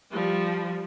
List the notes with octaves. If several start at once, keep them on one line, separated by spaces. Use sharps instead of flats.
F3 G3